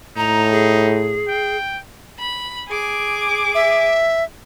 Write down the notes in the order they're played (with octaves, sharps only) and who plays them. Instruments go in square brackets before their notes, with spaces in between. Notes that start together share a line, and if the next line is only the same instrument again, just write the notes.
[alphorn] A2 [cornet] D#4 [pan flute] A#5
[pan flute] G#4
[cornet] G5
[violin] B5
G#4 D6
[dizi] E5